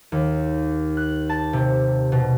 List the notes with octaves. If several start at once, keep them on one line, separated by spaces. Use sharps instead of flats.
D#2
F#6
A5
C3
B2